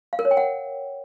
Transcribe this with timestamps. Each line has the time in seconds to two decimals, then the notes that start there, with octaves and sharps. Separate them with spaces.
0.13 F5
0.19 A#4
0.25 C#5
0.31 G5
0.37 F#5